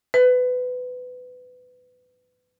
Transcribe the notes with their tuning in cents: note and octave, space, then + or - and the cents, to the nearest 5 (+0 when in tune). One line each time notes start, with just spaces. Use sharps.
B4 +20